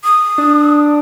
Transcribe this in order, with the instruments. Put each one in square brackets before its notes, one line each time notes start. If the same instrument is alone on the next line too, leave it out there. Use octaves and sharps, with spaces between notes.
[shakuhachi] D#6
[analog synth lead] D4